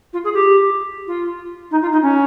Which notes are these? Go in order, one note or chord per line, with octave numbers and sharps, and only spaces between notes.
F4
G#4
G4
F4
D#4
F4
D#4
C#4